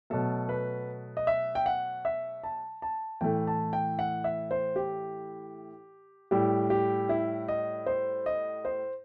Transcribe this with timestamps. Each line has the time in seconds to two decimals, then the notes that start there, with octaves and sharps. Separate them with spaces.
0.10 B2 F#3 A3 A4
0.49 B4
1.17 D#5
1.27 E5
1.55 G5
1.66 F#5
2.05 E5
2.44 A5
2.82 A5
3.21 A2 E3 A3 G5
3.47 A5
3.73 G5
3.99 F#5
4.24 E5
4.51 C5
4.76 G4
6.31 A2 G3 G4
6.70 G4
7.09 E4
7.48 D#5
7.86 C5
8.26 D#5
8.65 C5